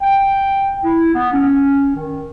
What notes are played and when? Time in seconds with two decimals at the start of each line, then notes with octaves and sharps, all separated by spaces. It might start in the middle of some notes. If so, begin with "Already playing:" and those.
0.01 G5
0.84 E4
1.14 B3
1.32 C#4
1.96 D#3